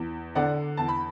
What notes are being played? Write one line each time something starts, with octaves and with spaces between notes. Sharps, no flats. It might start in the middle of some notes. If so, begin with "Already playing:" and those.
Already playing: E2
D3 D5 F#5
E2 A5
B5